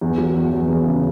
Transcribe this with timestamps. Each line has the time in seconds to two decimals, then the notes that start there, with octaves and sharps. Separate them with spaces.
0.01 E2
0.18 F#3
0.35 E2
0.53 E2
0.68 E2
0.85 C#3